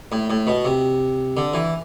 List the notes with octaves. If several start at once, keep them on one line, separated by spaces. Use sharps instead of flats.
A2
A2
B2
C3
D3
E3